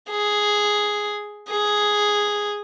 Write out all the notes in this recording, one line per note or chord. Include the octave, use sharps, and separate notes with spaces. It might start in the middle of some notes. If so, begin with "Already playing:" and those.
G#4
G#4